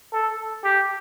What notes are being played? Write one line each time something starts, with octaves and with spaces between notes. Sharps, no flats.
A4
G4